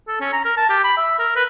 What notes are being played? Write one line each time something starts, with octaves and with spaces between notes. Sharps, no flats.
A4
C#4
A#5
A#4
A5
G4
B5
E5
A#4
B4